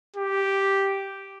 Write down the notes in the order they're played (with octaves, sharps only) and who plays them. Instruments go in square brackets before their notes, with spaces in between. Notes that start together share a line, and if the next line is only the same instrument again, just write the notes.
[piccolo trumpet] G4